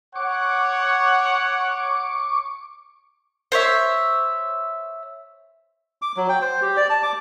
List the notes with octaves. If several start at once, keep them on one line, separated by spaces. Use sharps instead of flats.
C#5 F#5 C#6 D6
C5 C#5 E5
D6
F#3
G5
C5
G4
D5
A5
D6